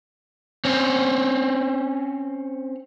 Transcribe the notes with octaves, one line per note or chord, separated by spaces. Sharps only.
C4 C#4